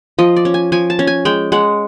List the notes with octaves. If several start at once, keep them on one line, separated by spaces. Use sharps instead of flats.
F3 D#5
D5
C#4
G#5
F3 G#5
A5
C#4
G#5
G#3 G5
G#3 F#5